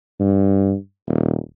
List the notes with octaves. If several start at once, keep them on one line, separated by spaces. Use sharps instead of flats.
G2
D#1